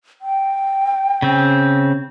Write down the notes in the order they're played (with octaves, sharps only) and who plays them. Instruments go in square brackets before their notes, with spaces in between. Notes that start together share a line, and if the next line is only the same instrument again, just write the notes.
[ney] G5
[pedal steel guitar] C#3 C4